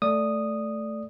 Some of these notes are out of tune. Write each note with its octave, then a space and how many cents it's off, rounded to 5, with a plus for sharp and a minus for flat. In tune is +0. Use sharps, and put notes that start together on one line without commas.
A3 +0 D5 +0 D#6 -5